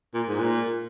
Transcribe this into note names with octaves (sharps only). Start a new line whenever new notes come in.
A#2
G#2
A#2